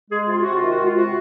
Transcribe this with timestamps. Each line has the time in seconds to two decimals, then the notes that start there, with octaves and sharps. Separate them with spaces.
0.10 G#3 G#4
0.27 C3 F4
0.41 C3 F#4
0.54 F4
0.62 D#3
0.68 F#4
0.79 G#3 F4
0.96 C3 F#4